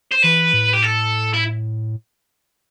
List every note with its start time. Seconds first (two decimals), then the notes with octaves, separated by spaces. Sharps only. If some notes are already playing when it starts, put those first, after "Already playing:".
0.11 C5
0.22 E3 B4
0.53 A2
0.74 G4
0.83 A4
1.33 E4